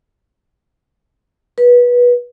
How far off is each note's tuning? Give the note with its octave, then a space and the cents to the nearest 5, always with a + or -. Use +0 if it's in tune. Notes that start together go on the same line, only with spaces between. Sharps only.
B4 -20